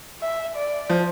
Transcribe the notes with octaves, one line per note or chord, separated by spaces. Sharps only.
E5
D5
F3